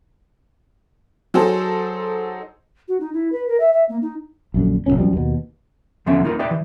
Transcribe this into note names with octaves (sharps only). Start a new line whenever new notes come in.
F#3 D#4 G#4 A4 C5
F#4
D#4
E4
B4
A#4
E5
E5
A#3
D#4
A#1 F#2 D3
F#1 F2 A#2 C#4
C2 F#2 F3 G3
D#2 B2
E2 D3 F3 B3 C#4 E5
A#3 D#4 F4 A#4
D#4 G4 B4 D5 E5 G5
E3